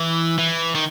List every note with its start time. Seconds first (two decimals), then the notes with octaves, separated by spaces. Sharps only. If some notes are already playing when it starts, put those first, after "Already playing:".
Already playing: E3
0.38 E3
0.75 D#3